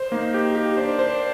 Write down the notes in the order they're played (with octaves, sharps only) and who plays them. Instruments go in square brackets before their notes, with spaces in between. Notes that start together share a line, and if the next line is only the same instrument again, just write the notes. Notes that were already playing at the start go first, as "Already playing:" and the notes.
Already playing: [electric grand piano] C5
[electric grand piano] A#3 [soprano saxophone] D#4
[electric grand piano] G4
G4
[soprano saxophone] D4 [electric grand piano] C5
[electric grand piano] C5